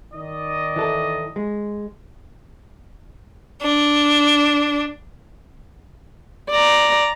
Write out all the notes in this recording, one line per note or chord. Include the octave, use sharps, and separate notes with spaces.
D#3 D5 D#5
E3 A4
G#3
D4
D5 A#5